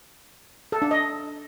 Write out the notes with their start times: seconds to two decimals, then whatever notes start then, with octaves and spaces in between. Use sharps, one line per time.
0.72 A4
0.82 D4
0.91 D#5